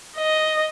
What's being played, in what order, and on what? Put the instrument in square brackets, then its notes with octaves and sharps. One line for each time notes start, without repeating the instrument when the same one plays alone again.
[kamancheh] D#5